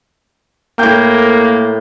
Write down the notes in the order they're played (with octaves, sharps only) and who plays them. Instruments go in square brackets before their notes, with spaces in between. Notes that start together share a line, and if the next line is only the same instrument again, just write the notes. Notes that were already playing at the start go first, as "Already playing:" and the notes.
[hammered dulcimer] A2 G5 [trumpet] A#3